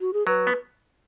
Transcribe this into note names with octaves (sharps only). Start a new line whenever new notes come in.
F#4
G#4
F#3 B4
B3